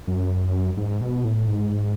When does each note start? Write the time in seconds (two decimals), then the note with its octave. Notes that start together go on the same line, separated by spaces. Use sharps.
0.07 F#2
0.77 G#2
1.01 B2
1.25 A2
1.48 G#2